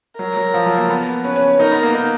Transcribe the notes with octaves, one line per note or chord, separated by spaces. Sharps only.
F#3 A#4
F#3
F3
F#3
A#3
B3
C#4 B4
C#4
C#4
D#4 A#4
B3
A#3
D#4